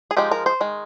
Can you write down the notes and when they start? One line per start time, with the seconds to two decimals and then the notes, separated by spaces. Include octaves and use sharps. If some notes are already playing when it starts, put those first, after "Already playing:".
0.11 G#4
0.17 F3 G#3 D#4 G4
0.31 A#4
0.46 C5
0.61 D#3 G#3